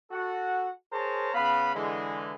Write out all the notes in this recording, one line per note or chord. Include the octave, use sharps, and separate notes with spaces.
F#4 A4 F#5
G#4 A#4 C5 C#5 A5 A#5
C#3 B3 F5 B5
D3 E3 G#3